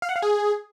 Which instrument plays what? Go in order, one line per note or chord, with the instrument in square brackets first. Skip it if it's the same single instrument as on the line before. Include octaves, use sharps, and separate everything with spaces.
[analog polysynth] F5
F#5
F5
G#4